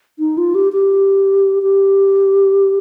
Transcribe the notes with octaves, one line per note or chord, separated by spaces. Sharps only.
D#4
F4
G4
G4
G4